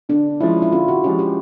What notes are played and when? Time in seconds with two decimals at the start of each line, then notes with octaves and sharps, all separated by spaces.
0.09 D3 D4
0.40 F3 G#3 C#4 E4
0.62 E4
0.72 D3 F4
0.88 F#4
1.04 F3 G#3 C#4 G4
1.19 G4